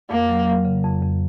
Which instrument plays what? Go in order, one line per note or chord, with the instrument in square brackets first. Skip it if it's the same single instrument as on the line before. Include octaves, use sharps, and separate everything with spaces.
[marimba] F2 [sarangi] A#3
[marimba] F#3
F#3
C#3
F2
F2